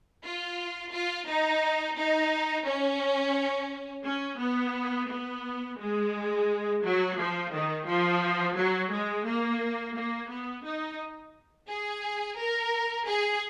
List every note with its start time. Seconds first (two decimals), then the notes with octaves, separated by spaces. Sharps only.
0.24 F4
0.92 F4
1.28 D#4
1.96 D#4
2.66 C#4
4.05 C#4
4.39 B3
5.09 B3
5.78 G#3
6.83 F#3
7.18 F3
7.52 D#3
7.87 F3
8.56 F#3
8.91 G#3
9.26 A#3
9.96 A#3
10.31 B3
10.65 D#4
11.69 G#4
12.38 A#4
13.07 G#4